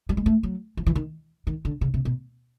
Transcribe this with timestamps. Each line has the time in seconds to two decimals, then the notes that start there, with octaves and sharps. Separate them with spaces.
0.09 G3
0.17 G#3
0.26 A3
0.43 F#3
0.77 F3
0.86 E3
0.95 D#3
1.47 D#3
1.65 D3
1.81 C#3
1.94 C3
2.05 B2